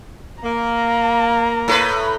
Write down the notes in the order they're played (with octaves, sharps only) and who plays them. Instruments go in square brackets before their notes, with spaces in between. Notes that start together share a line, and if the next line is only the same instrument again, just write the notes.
[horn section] A#3 [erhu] A#5
[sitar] A2 A4 B4